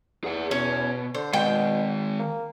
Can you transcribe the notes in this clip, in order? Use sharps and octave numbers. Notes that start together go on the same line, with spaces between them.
E2 G#4 F#5
B2 C#4
D3 C5
B2 D#3 G#3 G5
A#3